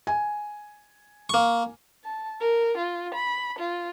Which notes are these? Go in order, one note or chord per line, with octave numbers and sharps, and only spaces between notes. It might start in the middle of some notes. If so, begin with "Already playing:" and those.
G#5
A#3 C#6
A5
A#4
F4
B5
F4